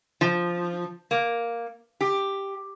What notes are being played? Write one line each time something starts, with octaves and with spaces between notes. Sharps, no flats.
F3
A#3
G4